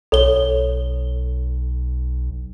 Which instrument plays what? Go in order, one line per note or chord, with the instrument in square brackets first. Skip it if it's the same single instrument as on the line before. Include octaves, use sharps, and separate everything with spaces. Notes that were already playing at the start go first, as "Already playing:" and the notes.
[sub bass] B1 [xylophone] A4 C#5 G7